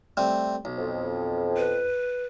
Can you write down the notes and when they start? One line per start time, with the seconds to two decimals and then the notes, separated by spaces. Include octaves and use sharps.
0.17 G3 A3 C4
0.65 B1
0.78 F2
1.57 B4